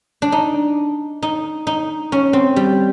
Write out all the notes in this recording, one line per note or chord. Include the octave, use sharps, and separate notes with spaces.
D4
D#4
D#4
D#4
C#4
C4
G3